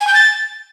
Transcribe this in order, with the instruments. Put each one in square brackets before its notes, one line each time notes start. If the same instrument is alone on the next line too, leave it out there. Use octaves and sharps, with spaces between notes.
[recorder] G#5
G6
A6